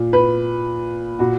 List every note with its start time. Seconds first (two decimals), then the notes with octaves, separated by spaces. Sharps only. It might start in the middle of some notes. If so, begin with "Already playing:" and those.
Already playing: A#2
0.13 B4
1.19 A#2 F#4